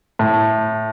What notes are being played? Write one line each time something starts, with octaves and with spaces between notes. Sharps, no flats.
A2